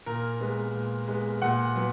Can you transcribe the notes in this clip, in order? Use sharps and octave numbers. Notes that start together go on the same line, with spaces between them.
A#2 A#4
G#3 B3
A#2
G#3 B3
A#2 F#5
F#3 B3